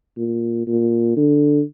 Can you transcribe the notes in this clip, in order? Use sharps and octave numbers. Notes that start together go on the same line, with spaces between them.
A#2
A#2
D3